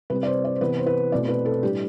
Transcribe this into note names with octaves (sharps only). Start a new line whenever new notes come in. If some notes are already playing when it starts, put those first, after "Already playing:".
C3 G3 C4 B4
D5
C5
D5
C5
C3 E3 B3 B4
C5
B4
B2 A3 C4 D5
B4
A4
A2 G3 D4 G4